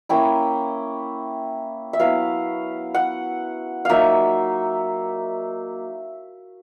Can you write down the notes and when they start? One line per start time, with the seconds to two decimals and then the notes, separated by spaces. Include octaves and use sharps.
0.09 A#3 C#4 E4 G5
1.93 E5
1.99 F#3 B3 E4 F5
2.95 F#5
3.85 F#3 A#3 D#4 E5 F5